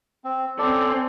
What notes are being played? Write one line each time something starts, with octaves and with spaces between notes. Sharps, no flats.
C4
C4 C#4 A4 D5